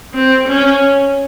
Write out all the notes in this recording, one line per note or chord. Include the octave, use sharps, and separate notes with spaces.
C4
C#4